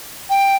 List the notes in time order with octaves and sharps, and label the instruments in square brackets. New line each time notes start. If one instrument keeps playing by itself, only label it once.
[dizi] G5